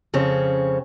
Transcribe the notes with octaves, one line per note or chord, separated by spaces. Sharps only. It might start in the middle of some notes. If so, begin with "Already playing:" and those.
F2 C#3 C4 C#4